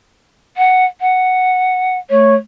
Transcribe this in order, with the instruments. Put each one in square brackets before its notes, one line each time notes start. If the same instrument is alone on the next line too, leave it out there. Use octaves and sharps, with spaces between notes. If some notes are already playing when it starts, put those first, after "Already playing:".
[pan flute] F#5
F#5
[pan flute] A3 [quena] C#5